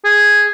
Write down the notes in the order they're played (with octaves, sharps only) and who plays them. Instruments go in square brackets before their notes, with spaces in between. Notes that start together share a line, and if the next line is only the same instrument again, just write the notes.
[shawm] G#4